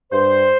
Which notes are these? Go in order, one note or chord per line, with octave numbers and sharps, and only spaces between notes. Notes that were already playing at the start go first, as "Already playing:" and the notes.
G2 C5